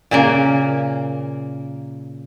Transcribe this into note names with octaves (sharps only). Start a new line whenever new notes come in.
A#2 C#3 A#3